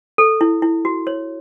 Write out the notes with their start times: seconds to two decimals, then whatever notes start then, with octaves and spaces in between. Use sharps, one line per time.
0.18 A4
0.41 E4
0.62 E4
0.85 F#4
1.07 C#5